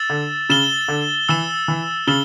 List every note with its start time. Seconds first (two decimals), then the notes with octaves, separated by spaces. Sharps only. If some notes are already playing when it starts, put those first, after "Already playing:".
Already playing: E6 A6 E7 G7
0.10 D3
0.50 C#3 E6 A6 E7 G7
0.88 D3
1.29 E3 E6 A6 E7 G7
1.68 E3
2.07 C#3 E6 A6 E7 G7